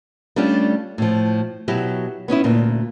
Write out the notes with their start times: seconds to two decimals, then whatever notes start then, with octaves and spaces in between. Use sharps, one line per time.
0.36 G3 A3 C#4 D4 F4 G4
0.98 A2 F3
1.68 B2 F#3 E4 F#4 G4
2.28 B3 C#4 D#4 E4
2.44 D2 A#2